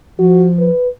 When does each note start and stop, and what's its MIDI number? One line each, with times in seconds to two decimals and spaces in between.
0.19 0.70 53
0.19 0.47 66
0.59 0.89 71